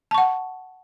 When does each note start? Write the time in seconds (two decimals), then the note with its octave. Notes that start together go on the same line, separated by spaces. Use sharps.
0.11 A5
0.14 C#6
0.18 F#5